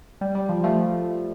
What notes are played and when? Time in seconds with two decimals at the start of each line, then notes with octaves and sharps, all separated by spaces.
0.21 G3
0.35 G3
0.49 F3
0.64 F3 A3